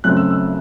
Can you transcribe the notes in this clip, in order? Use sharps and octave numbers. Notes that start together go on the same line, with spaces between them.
F#2 C#3 F#3 A3 C4 F#6
E6
E6